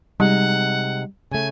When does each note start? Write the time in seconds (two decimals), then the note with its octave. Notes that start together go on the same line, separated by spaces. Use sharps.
0.20 C3 G3 G#3 D#4 F#5
1.32 C#3 A3 G#5